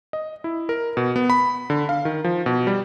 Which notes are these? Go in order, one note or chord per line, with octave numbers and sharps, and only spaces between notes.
D#5
E4
A#4
B2
B3
B5
D3
F5
D#3
F3
B2
G3